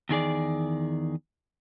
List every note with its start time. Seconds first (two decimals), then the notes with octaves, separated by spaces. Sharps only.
0.09 E2 D#3 G#4 D5